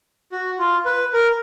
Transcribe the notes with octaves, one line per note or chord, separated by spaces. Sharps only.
F#4
F4
B4
A#4